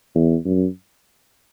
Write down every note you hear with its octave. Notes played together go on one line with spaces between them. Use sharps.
E2
F#2